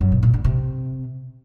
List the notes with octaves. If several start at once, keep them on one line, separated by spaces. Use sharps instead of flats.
F#2
B2
A#2
D3
C3